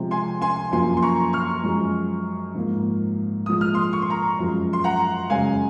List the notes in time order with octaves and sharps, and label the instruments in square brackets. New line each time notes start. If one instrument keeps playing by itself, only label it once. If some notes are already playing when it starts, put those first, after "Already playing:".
Already playing: [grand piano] C3 F3 G#3
G#5 C6
G#5 C6
F#2 F3 A#3 G#5 C6
C6
A#5 C#6
C#6 F6
F#2 F3 G#3
G#2 F3 A#3
A#2 F3 G#3 D#6
F6
C6 D#6
C#6
C6
A#5 C#6
F#2 F3 G#3
C6
F#5 A#5
F#2 C#3 G#3 F5 G#5